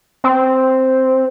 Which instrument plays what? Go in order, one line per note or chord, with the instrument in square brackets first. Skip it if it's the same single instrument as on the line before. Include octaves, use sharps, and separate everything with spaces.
[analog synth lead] C4